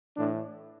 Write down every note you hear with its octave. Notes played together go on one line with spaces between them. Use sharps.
A2 E3 D4